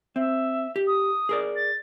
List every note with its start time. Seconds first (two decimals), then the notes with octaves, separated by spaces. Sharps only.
0.16 C4 E5
0.76 G4
0.87 D#6
1.29 G#4 A#4 D5
1.56 A6